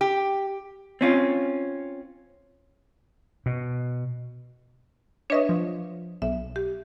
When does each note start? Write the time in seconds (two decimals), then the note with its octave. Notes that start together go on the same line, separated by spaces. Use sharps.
0.01 G4
1.01 C4 C#4 F4
3.46 B2
5.30 D4 B4 C#5 D#5 E5
5.49 F3
6.22 B1 E5
6.56 G4